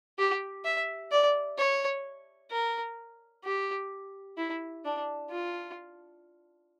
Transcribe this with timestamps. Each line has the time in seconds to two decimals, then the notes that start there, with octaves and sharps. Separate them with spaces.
0.18 G4
0.64 E5
1.11 D5
1.58 C#5
2.51 A#4
3.44 G4
4.37 E4
4.84 D4
5.30 F4